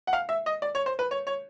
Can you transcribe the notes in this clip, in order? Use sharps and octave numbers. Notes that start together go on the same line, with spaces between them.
F#5
F5
E5
D#5
D5
C#5
C5
B4
C#5
C#5